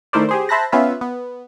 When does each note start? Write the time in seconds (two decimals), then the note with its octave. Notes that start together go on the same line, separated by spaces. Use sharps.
0.13 D#3 A3 E4 A#4 C5 D5
0.29 G4 G#4 C5
0.49 C5 E5 A5 B5 F#6 A#6
0.72 B3 C#4 F4 B4 E5
1.01 B3